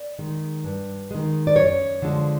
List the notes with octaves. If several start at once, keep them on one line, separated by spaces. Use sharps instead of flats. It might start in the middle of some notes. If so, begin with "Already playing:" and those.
Already playing: D5
D#3 G#3
G2
D#3 G#3
D5
F#2 C#5
D3 F3 G#3